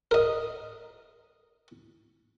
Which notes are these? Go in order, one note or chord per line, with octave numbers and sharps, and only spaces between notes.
A#4 D#5